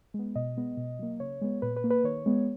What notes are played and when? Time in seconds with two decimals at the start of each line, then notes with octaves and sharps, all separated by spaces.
0.14 G#3 B3
0.35 B2 D#5
0.57 G#3 B3
0.77 B2
0.99 F#3 A#3
1.20 C#3 C#5
1.41 G#3 B3
1.62 A#2 B4
1.76 B4
1.84 A#3
1.90 B4
2.04 D#3 C#5
2.26 G#3 B3